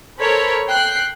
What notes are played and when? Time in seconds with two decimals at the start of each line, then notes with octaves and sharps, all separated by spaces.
0.20 A4 A#4 C5 C#5 B5
0.68 G5 F#6 C7